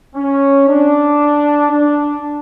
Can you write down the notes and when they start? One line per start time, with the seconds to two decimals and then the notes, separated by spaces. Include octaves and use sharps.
0.15 C#4
0.68 D4
1.71 D4